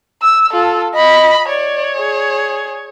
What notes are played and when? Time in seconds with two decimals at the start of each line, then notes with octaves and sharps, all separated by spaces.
0.22 E6
0.53 F4 A4
0.95 D#5 B5
1.49 C#5 D5
1.96 G#4